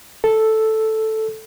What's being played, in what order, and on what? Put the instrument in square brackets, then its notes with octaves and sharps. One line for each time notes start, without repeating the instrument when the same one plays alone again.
[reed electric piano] A4